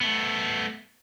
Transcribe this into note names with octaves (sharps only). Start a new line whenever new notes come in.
A3 B3